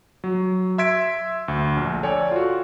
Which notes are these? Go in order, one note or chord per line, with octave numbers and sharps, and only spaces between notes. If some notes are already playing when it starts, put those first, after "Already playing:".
F#3
E5 C6 E6 G#6 B6 D7
D2
A#1
A4 C#5 D5 G5 G#5
F4 F#4